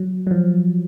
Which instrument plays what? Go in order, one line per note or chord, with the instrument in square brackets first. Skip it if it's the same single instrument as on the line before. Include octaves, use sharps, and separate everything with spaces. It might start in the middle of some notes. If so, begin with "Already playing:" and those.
Already playing: [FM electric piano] F#3
F#3
F3